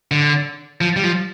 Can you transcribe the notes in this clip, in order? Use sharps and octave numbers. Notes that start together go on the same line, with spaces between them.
D3
F3
G3
F3